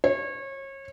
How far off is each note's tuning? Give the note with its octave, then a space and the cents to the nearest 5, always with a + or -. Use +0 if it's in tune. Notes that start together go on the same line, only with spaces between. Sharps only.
C#5 -30